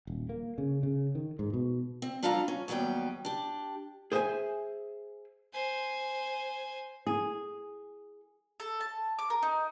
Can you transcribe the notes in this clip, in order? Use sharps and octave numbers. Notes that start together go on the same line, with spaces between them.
D#1
A#3
C#3
C#3
D#3
G#2
B2
C4
G3 D4 F4 A4 F5 A#5
C#4
D#2 F#3 G3 B3 G5
D4 G4
G#4 C5 E5 F#5 G#5
C5 G#5
G#4
A4
A5
D6
A#4
D#4